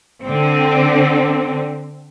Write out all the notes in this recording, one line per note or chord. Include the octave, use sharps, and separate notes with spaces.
D3 C4